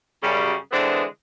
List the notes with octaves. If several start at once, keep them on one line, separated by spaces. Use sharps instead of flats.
F#2 C#3 G3
D3 E3 G#3 B3 C4 D4